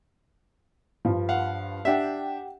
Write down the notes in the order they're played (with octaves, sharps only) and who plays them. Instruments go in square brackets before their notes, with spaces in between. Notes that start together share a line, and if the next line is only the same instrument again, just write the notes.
[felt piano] G2 F3
[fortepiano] F5 F#5
[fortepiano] D4 E5 [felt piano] G4 F#5 G5